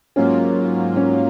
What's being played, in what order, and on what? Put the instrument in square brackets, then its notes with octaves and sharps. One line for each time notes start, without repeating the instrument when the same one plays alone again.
[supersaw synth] G#2 F#3 A#3 F4 [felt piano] C#4
[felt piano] C#4